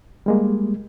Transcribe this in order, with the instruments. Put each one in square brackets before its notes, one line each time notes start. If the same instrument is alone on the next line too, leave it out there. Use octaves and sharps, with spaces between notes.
[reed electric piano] G3 G#3 A#3